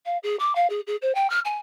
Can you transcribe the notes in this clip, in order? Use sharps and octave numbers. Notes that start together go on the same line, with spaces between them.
F5
G#4
D6
F5
G#4
G#4
C5
G5
F6
G#5